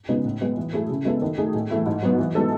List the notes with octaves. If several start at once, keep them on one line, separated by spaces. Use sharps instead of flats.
C#3 G#3 B3 D#4
A2
G#3 B3
E3
A3 E4 G#4
C#3
G#3 B3 E4 A4
D#3
A3 D#4 G#4
A2
E3 A3 E4
G#2
F#3 B3
E3
G#3 B3 D#4 A4